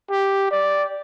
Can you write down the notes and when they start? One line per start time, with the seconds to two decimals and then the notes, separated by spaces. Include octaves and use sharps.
0.11 G4
0.51 D5